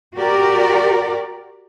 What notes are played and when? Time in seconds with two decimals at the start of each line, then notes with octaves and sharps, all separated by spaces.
0.16 F#4 G4 A#4 D5